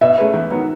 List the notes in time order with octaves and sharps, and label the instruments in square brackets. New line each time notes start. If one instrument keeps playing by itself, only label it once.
[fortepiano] B2 [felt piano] E5
[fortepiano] A3 C#4 G#4 B4
E2
D#3 F#3 B3